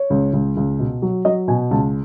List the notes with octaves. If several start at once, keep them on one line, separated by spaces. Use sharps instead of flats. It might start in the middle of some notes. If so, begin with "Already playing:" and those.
Already playing: C#5
C#2
C#2
C#2
B2
F#3
F#3 D#5
B2 G#5
C#2 A5